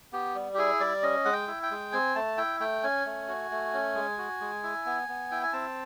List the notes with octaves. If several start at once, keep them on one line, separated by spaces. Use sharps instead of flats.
B3 G4
G3
G4
E4 G#4
G3 D5
C#4 D#5
G#3 F#5
G5
E4
G5
G#3
C4 G#5
A3 A5
E4 G5
A3 G5
C#4 G#5
A3
F#4
A3
C#4
G#3
F#4
G#3
E4
B3
B3
E4 G5
G#5
C4 A5